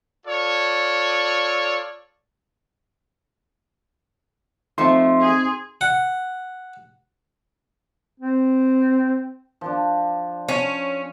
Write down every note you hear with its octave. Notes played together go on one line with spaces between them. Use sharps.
F4 A4 C#5 D5
F3 A3 C4 D#4 C6
G#4
F#5
C4
F3 D4
C#4 G#5